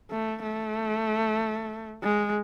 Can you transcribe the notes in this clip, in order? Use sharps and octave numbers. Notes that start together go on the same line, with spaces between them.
A3
A3
G#3